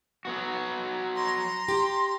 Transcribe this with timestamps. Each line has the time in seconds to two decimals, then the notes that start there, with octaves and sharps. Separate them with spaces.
0.25 F#3 B3 F#4
1.16 A#5 C6
1.68 G4